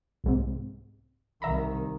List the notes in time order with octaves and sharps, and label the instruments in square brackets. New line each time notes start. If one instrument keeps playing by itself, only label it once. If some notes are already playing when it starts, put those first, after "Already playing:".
[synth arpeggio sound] C2 G#2 C3
[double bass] C2 D#3 [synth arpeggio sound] E5 A#5 B5